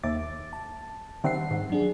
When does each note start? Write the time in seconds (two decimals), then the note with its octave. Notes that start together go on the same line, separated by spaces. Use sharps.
0.03 D#2 E5 D6 A6
0.53 A5
1.24 D#3 G3 C4 E5 F#5 C7
1.51 G#2
1.70 F#3 D4 G#4